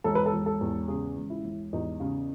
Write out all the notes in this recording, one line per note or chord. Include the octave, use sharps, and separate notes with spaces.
E1 A4
B4
A4
E1
A4
E2
C#3 G#4
E1
E4
E1
E2 D#4
C#3